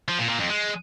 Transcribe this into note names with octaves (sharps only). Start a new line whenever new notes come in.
F3
A#2
A#2
F2
G#3